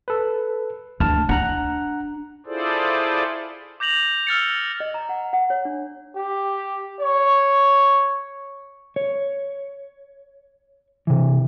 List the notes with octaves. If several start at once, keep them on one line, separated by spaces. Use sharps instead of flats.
A4 B4
D2 A5 F6
D4 F#5 A#5 F#6
E4 F4 G#4 A4 C5 D5
D6 G6 A#6 F7 F#7
E6 F6 A6 C#7
D#5
A#5
F#5
F#5
C#5
D4
G4
C#5
C#5
C3 E3